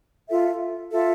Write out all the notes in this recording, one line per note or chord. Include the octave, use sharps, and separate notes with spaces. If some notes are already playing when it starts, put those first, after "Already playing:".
F4 A4 E5
F4 A4 E5